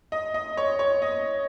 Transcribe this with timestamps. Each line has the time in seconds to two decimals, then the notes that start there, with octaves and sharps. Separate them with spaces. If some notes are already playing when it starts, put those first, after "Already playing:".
0.12 D#5
0.34 D#5
0.57 C#5
0.79 C#5
1.02 D#5